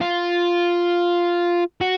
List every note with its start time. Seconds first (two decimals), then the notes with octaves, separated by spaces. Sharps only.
0.01 F4
1.81 F#4